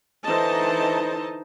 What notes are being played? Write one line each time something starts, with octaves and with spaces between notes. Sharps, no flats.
D3 E3 D#4 C5 D#5 A5